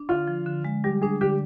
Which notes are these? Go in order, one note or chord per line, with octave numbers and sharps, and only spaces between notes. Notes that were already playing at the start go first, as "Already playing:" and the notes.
Already playing: D4
D3 F4
F3
D3
G#3
G3 G4
D4 G#4
D3 G4